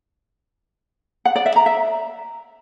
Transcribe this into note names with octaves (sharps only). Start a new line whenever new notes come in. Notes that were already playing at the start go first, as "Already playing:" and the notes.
F#5
D5
E5
A#5
E5